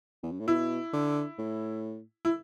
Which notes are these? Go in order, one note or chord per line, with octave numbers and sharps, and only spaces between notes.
E2
F#2
A2
B2 E4
D3
A2
E4